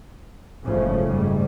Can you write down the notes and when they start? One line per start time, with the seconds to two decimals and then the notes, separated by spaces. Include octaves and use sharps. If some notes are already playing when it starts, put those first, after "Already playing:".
0.64 F#1 G#2 C#3 F3 A3 C#4
1.08 G#2 G3 A3